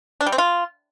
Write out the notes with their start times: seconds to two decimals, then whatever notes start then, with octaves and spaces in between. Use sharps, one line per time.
0.21 D4
0.26 G3
0.32 C4
0.38 F4